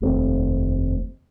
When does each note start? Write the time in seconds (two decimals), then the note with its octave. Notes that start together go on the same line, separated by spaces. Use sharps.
0.01 F1 D#2 A3 C4